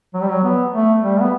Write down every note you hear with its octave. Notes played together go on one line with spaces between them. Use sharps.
F#3
G3
F#3
B3
A3
G3
B3